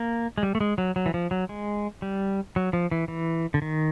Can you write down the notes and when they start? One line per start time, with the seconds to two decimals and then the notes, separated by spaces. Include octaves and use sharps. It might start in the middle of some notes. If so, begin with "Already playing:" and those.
Already playing: A#3
0.38 G#3
0.43 G3
0.55 A3
0.61 G#3
0.78 F#3
0.96 F#3
1.06 E3
1.14 F3
1.31 F#3
1.49 G#3
2.02 G3
2.56 F#3
2.73 F3
2.91 E3
3.08 E3
3.54 D3
3.62 D#3